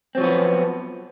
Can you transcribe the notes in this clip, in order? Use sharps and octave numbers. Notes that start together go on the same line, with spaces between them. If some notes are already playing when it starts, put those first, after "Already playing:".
F3 F#3 B3 C4